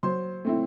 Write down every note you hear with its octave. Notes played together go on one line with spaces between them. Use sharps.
F#3 C5 C6
A3 C4 E4